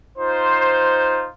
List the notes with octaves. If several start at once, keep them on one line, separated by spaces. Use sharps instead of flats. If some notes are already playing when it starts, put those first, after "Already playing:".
D#4 F4 C5